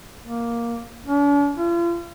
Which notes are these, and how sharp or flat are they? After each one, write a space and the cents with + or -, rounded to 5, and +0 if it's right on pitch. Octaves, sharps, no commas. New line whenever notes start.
A#3 +5
D4 -45
F4 -40